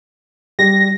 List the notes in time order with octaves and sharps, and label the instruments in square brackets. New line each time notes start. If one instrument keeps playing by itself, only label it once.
[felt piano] G3 [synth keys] A#6